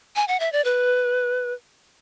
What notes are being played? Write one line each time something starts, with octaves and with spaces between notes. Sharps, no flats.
G#5
F#5
E5
D5
B4